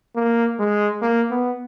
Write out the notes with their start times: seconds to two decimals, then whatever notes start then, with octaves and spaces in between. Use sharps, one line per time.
0.16 A#3
0.59 G#3
1.02 A#3
1.31 B3